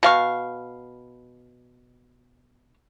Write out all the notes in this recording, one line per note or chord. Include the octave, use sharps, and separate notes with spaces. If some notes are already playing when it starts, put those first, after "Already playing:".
B2 F5 C#6